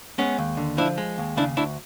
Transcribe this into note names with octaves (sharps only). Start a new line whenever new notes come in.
G#3 B3 C#4
D#2
D3
F3 D4 E4
G#3
D#2
C#3 D4 E4
D2 D4 E4